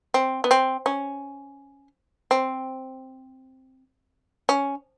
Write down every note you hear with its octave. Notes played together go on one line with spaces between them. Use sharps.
C4
B3
C4
C#4
C4
C#4